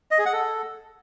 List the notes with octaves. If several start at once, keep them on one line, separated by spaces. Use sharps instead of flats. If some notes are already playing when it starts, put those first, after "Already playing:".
D#5
G#4
F#5
A4